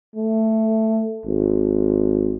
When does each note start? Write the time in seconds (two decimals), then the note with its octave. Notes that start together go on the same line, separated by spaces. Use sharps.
0.16 A3
1.26 G#1